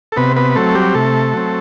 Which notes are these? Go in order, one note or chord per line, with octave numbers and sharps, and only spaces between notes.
A4
C3 B3 B4
B3 B4
F#3 A3 C4 A4
G3 G4
C3 A3 A4
F#3 C4